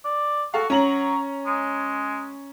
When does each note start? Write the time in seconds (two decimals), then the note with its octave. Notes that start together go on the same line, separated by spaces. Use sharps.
0.05 D5
0.54 F#4 A4 F5
0.70 F#3 C#4 A#5 F#7
1.46 G#3